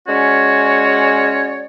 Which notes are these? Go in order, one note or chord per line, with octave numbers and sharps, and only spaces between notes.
G#3 C#4 F#4 C#5 D5